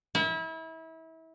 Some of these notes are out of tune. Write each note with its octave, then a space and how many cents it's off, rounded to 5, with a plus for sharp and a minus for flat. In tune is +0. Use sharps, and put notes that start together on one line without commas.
E4 -30